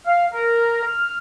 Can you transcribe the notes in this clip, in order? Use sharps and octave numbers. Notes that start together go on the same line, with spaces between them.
F5
A#4
F6